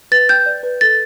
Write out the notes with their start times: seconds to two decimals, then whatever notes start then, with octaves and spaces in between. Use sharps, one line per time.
0.12 B4 A6
0.29 G5 G6
0.46 D5
0.63 B4
0.81 A4 A6